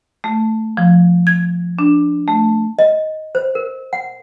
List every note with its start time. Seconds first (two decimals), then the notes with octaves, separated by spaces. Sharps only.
0.24 A3
0.77 F3
1.27 G#6
1.79 D4
2.28 A3
2.79 D#5
3.35 C5
3.55 A#4
3.93 F#5